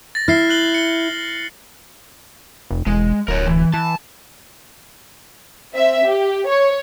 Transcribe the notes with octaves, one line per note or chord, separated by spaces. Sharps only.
A6 A#6
E4 F6 C7 G7
F#6 F#7 G7
C#7 G7
F1
E1 G#3
D1 A#4 C#5
E3
E3 A5
C4 E5
G4
C#5